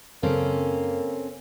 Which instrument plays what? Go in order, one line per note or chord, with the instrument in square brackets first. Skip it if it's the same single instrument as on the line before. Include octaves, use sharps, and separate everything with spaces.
[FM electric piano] F#2 C#3 [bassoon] A#3 [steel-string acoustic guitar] C4 C#4 A4